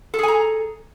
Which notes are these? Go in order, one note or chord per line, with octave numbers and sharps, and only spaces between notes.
G#4 A4 G#5 A#5